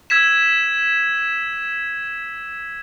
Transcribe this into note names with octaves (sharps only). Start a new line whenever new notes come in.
E6 G#6 B6 E7